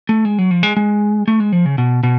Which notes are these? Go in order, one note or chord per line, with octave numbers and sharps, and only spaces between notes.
A3
G#3
F#3
F3
G#3
G#3
A3
G#3
F3
C#3
B2
B2